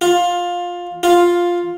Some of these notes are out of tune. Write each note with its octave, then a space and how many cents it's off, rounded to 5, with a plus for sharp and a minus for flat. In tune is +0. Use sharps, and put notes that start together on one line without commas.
F4 +15
F4 +5